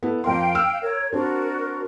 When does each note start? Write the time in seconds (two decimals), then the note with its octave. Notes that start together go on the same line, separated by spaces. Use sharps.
0.03 B3 E4 A4
0.24 F2 A#4 F5 G5 C6
0.55 E6 F6 D7
0.81 A#4 C#5
1.13 C4 D4 F#4 A#4 D5